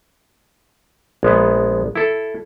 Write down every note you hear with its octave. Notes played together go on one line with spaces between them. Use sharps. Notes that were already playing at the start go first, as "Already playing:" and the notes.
A#1 G#3 B3
E4 A4